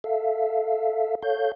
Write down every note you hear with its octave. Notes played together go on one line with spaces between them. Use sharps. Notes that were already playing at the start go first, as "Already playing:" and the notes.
A4 E5 F5
A4 C#5 F5 G6